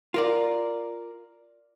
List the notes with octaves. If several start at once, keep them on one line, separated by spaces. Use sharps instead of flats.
F4 A#4 D5